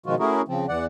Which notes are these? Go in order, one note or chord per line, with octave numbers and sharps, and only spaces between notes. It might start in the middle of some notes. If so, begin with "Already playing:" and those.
B2 D#3 F3 G#3 F4 F#4
A3 C#4 E4 F#4 G#4 A#4
C#3 F3 C4
E2 E3 D5 F#5